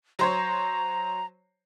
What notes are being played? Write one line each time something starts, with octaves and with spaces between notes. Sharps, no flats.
F#3 C5 C#5 A#5